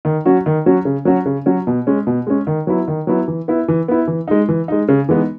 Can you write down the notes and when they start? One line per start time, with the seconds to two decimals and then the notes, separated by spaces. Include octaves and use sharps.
0.05 D#3
0.25 F#3 C#4 F#4
0.46 D#3
0.66 F#3 C#4 F#4
0.85 C#3
1.05 F#3 C#4 F#4
1.26 C#3
1.46 F#3 C#4 F#4
1.67 B2
1.87 G#3 C#4
2.07 B2
2.27 G#3 C#4
2.47 D#3
2.67 F#3 B3 E4
2.88 D#3
3.07 F#3 B3 E4
3.28 E3
3.48 B3 E4
3.68 E3
3.88 B3 E4
4.07 E3
4.28 G#3 D#4
4.49 E3
4.68 G#3 D#4
4.88 C#3
5.09 E3 G#3 B3 D#4